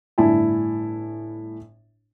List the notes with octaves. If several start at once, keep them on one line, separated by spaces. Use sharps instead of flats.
G1 A2 D4 E4 G#5 A5